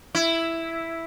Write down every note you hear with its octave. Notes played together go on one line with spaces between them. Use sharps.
E4